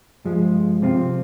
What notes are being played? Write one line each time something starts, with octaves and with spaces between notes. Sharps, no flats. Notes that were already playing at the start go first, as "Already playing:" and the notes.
G2 F3 G#3
C3 F3 C4 F4